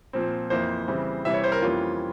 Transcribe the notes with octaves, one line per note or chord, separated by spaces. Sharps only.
A#2 F3 C4
F2 E3 A#3 C5
C#3 E3 G3 C4
C3 E3 G3 C4 E5
C#5
C5
A#4
F2 E3 G3 A#3 C#4 F4